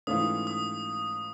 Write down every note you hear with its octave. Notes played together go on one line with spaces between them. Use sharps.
G#2 E3 A3 C#4 F4 D#6
D#6